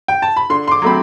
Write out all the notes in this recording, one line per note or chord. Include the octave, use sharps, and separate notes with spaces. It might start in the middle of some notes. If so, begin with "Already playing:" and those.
G5
A5
B5
D3 C6
C6
D6
F#3 A3 C4 B5